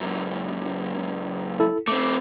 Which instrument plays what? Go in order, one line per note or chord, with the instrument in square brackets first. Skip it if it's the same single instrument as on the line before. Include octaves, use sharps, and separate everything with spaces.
[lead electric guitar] C#2 F#2
[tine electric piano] E4 A4
[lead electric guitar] A3 C4 [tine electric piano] D6